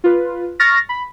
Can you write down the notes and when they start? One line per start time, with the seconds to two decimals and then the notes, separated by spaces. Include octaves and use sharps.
0.04 F4 B4
0.60 C#6 F6 A6 A#6
0.89 B5